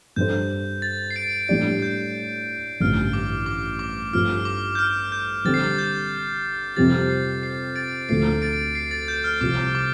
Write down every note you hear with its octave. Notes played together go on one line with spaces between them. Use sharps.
G2 G3 D4 A4 C5 G6
A6
C7
A6 D7
A2 G3 D4 G4 D5 A6
G6
A1 G2 D3 F3 F6
D6
D6
D6
G2 F3 A3 F4 F6
D6
G6
F6
G6
D3 G3 C4 A6
C7
A6
G6
F2 C3 G3 C4 G4 A6
C7
C7
A6 D7
D2 D3 F3 A3 C7
A6 D7
C7
A6
G6
F6
C2 C3 F3 D6
D6